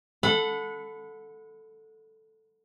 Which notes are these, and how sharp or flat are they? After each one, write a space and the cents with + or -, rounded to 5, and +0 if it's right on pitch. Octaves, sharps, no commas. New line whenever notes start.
A4 +0 F#5 -25 B5 +20